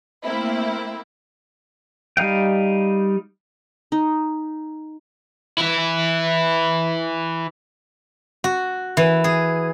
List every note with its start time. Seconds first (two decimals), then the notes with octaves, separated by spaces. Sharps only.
0.24 A3 A#3 C4 E4
2.17 G3 D#4 F5 G5
3.92 D#4
5.58 E3 E4
8.44 F#4
8.97 E3
9.24 G#4